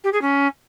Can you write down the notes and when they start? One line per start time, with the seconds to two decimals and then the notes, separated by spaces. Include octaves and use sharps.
0.04 G4
0.13 G#4
0.21 C#4